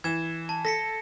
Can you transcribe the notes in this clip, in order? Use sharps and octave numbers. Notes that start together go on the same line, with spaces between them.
E3 G#6 E7
A5
A4 A#6 B6 C#7